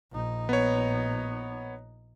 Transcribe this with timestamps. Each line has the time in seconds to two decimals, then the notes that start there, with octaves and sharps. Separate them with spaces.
0.12 A#1 D#4
0.49 B3 C#5